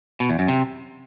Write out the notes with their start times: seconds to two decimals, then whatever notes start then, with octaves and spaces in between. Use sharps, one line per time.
0.20 B2
0.30 E2
0.39 F#2
0.48 C3